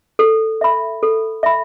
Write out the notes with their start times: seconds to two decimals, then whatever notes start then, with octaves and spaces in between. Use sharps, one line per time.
0.19 A4
0.61 E5 B5
1.03 A4
1.43 E5 B5